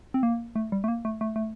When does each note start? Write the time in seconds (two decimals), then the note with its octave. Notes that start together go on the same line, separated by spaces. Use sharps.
0.14 C4
0.23 A#3
0.55 A3
0.72 G3
0.84 A3
0.88 A#3
1.05 A3
1.21 A3
1.36 A3